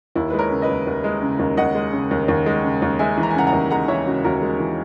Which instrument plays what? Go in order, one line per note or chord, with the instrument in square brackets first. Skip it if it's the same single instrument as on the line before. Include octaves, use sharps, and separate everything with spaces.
[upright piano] D#2 E4
G#3 B4
A#4 C#5
C#3
B4 D#5
D#2
D#2
G#3
C#3
D#2
D#2 D#5 F#5
G#3
C#3
D#2
D#2
G#3
C#3
D#2
G#3 E5 G#5
E3
A#5
G#5
C#3 F#5 A#5
F#5 A#5
D#2
G#3 F#5 A#5
E3 C#5 E5
C#3 F#4
D#2 F#4 A#4
G#3
E3